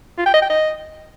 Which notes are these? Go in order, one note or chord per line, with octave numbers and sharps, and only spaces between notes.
F4
G5
D#5
G5
D#5